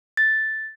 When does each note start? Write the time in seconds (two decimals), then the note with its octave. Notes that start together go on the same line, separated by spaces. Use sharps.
0.17 A6